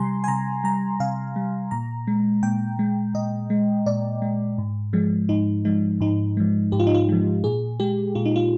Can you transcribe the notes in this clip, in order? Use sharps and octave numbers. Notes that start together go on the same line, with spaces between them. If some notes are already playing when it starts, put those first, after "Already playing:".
Already playing: C3 G3 G#5 A#5 C6
G#5
C3 A#5
G3 A#5
C3 F5
G3
A#2 A#5
G#3
A#2 G5
G#3
A#2 D#5
G#3
A#2 D5
G#3
G#2
F3 G#3
G#2 D#4
F3 G#3 D#4
G#2 D#4
F3 G#3
G#2 G4
F4
D#4
F4
F3 G#3
A#2 G#4
G#3 G4
A#2 F4
D#4
F4